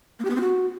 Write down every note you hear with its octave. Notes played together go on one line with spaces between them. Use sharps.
A#3
G4
B3
C4
F#4